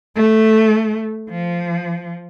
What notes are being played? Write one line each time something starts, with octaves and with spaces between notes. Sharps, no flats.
A3
F3